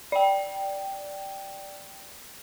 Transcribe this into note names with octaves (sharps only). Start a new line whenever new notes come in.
D5 G5